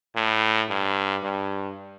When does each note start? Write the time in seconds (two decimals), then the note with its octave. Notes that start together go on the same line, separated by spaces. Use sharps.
0.16 A2
0.69 G2
1.23 G2